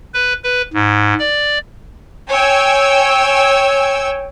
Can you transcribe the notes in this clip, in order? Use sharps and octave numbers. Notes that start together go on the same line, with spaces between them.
B4
B4
G#2
D5
C#5 G5 G#5 E6